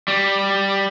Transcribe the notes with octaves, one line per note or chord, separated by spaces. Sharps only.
G3